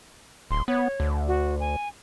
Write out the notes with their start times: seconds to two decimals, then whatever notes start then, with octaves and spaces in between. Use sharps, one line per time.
0.51 D1 C6
0.68 B3 C#5
1.00 D2
1.28 F#4
1.60 G#5